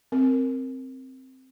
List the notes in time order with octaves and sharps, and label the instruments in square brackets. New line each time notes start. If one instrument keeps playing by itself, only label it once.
[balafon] C4 A#4